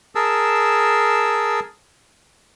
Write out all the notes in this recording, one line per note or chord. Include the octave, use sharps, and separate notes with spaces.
G#4 A#4 A5 E6